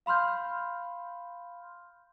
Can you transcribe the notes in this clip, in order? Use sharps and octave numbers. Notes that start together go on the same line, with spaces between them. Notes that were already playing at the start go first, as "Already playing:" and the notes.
F5 B5 C6 F6 G6